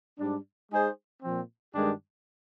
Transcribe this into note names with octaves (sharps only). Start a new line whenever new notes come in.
G#2 G3 D4
G#3 D#4 G#4 C5
A#2 F3 C4
G2 D#3 G#3 D4 G4